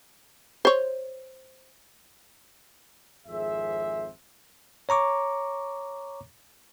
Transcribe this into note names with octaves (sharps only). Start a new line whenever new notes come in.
C5 C#5
G#1 F2 G#4 C5 E5
C#5 A#5 C#6 D6